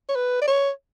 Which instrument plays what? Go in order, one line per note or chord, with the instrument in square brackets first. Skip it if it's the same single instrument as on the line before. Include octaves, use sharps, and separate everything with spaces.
[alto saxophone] C#5
B4
D5
C#5